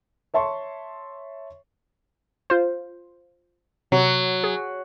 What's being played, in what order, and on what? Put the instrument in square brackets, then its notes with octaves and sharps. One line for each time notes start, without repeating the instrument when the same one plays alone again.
[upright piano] C#5 E5 A5 C6 C#6
[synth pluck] F4 C5
[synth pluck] C3 [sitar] F#3
[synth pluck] G#4